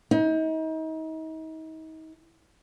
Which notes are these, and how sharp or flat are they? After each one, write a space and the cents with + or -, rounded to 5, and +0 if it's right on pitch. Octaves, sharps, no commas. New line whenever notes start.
D#4 +35